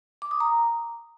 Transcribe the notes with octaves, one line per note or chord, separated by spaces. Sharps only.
D6
D#6
A#5